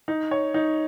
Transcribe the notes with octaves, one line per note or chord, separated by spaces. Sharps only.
D#4
C#5
D#4